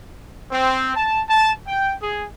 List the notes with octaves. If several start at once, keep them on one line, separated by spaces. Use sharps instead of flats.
C4
A5
A5
G5
G#4